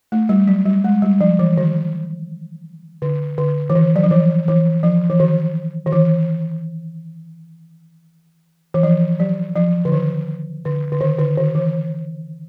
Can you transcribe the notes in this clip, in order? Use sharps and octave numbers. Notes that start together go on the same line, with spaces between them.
A3
G3
F#3
G3
G#3
G3
F3
E3
D#3
D3
D3
E3
D#3
F#3
F3
E3
E3
F3
E3
D#3
D#3
E3
E3
F3
F#3
F3
D3
D#3
D3
D3
D#3
D3
D#3
E3